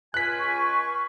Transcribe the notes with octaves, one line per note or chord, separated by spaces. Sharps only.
C#2 F4 G#5 F#6 B6
C#6